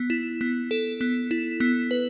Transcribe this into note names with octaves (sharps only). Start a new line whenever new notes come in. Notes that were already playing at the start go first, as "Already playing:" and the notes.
Already playing: B3
E4
B3
A4
B3
E4
B3
B4